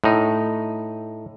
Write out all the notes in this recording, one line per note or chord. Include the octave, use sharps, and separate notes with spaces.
A2 D#4